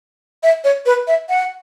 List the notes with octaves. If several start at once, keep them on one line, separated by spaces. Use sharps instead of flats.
E5
C#5
B4
E5
F#5